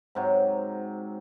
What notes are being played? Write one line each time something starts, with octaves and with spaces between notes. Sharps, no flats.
G#2 C3 F#3